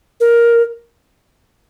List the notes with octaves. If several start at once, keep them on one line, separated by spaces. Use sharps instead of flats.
A#4